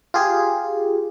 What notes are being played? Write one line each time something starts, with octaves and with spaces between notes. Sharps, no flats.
F4 G4 G#4